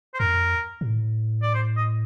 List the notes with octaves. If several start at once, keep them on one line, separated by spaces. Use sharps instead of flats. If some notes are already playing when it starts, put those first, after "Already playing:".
C5
F2 A#4
A#2
A2
D5
C5
D#5